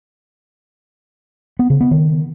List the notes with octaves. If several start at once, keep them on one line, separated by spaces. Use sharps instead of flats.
B3
C#3
B3
D#3